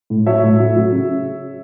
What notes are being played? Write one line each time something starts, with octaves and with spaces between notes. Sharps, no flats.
A2
F#3 C#5 E5
A2
F#3
F#3
C#3